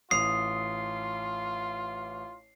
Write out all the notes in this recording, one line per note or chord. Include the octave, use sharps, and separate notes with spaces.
A1 F4 D#6 C7 F7